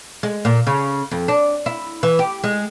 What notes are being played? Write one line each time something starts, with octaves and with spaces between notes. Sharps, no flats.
G#3
A#2
C#3
F2
D4
E4
E3
G4
G#3